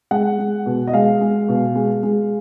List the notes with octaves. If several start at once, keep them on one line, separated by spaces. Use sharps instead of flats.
G#3 F#5
G#3
B2
D#5
G#3 F5
G#3
B2
G#3
G#3